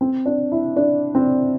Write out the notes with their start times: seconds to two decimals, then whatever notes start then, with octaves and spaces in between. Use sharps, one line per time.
0.01 C4
0.26 D4
0.52 E4
0.76 D4
1.15 C4